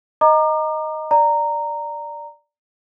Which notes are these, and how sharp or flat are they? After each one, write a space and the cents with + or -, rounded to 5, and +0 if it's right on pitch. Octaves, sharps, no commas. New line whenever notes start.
D#5 +0 A#5 +0 D6 +40
D5 +0 A#5 -10